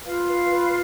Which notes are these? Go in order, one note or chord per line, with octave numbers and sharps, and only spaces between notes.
F4 B4 F5
B4
B4